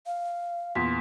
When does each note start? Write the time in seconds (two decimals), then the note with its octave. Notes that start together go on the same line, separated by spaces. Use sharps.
0.06 F5
0.75 E2 A#2 C6 B6